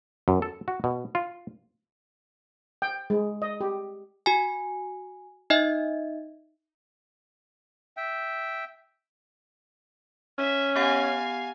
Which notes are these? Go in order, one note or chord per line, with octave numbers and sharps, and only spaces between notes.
F#2
A4
F#4
B2
F4
G5
G#3
D#5
G4
F#4 G#5
D#4 D#5 E5
E5 G5
C#4 E5
B3 G4 F5 F#5 G#5